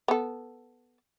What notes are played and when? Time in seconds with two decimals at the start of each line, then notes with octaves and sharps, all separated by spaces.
0.08 B3 A4